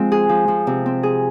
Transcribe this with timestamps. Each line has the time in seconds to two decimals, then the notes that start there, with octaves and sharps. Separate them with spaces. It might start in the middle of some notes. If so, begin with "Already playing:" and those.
Already playing: F3 G#3 C4 F4
0.12 G#4
0.29 F3
0.48 F3
0.67 C3
0.86 C4
1.03 G#4